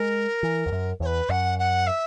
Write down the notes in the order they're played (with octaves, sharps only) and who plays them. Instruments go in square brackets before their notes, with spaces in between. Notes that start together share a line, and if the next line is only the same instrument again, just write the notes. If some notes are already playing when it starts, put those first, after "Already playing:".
Already playing: [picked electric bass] G#3 [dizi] A#4
[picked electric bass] E3
E2
F#2
[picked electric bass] E2 [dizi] C#5
[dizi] B4
[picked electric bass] F#2 [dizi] F#5
[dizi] F#5
E5